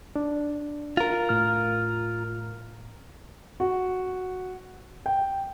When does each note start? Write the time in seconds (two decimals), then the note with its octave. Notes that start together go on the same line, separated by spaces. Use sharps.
0.16 D4
0.97 F4 A#4
1.29 A2 F6
3.60 F#4
5.06 G5